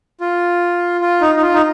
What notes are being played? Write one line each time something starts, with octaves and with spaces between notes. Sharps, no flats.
F4
F4
D#4
D#4
F4
D#4